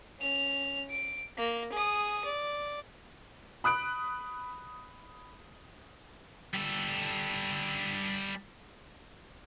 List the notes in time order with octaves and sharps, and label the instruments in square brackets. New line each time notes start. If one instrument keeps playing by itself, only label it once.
[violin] C#4 F7
D7
A#3
G#4 D#6
D5
[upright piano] B5 D#6 F#6 D7
[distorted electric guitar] G3 A4